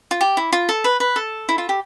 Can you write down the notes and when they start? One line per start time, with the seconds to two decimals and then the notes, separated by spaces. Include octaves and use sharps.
0.11 F4
0.21 G4
0.37 E4
0.53 F4
0.69 A4
0.84 B4
1.00 B4
1.16 A4
1.49 E4
1.58 F4
1.69 G4